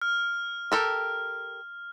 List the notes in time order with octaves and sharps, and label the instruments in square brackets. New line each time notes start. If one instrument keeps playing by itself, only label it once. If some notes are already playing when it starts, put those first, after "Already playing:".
[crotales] F6
[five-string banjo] G4 A4 A#4